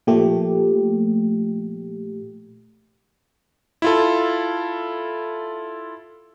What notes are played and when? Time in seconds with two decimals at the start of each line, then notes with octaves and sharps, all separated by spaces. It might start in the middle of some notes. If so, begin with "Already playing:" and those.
0.07 A#2 F3 A3 G4
3.82 E4 F4 A4